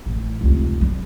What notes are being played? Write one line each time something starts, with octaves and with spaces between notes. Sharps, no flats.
A1
F1 C#2
G3